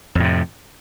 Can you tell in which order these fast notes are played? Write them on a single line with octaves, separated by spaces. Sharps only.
F2 A2 C3